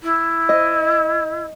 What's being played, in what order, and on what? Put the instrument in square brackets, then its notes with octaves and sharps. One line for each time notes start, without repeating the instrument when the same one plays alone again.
[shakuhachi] E4
[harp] D#5